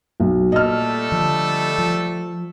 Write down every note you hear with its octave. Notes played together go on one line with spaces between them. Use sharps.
B1
A#2 G3 A3 A4 D#5 F6
D3 F3
F3